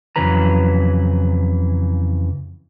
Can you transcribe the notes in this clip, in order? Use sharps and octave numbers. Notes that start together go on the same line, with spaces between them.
F2 C#3 E3 F#3 B4 A#5